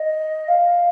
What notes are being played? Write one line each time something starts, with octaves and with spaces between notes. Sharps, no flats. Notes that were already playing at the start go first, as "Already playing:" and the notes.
Already playing: D#5
F5